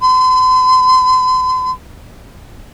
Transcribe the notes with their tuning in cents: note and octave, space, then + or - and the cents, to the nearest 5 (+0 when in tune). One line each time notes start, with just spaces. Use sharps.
C6 -45